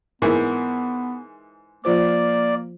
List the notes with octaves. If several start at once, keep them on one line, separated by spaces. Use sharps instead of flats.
G#2 E3 B3 E4 A#4
F3 A#3 F4 C5 D5